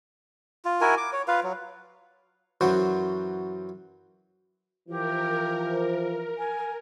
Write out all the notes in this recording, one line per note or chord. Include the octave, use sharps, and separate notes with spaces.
F4
E4 F#4 A#4 G#5
D6
C#5
F4 B4 F5
F#3
F#2 E3 F#3 F#4 C5
E3 F3 G4 A#4
G#5